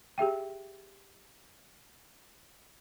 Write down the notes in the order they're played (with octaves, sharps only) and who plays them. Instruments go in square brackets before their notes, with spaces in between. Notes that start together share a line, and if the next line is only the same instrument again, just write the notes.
[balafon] G4 G#4 E5 G5